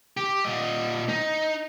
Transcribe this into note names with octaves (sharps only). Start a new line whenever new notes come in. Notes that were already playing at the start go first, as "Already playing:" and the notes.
G4
A#2 D#5
D#4